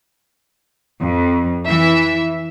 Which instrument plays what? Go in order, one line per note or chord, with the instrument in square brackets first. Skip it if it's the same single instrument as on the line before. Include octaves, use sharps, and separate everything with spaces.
[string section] F2
E3 E5